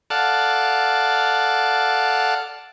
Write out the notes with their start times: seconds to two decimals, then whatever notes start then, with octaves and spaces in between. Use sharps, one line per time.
0.10 A4 D5 F5 F#5 A5